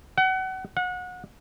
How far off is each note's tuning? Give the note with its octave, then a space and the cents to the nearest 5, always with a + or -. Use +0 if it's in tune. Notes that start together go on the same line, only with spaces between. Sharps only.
F#5 +30
F#5 -30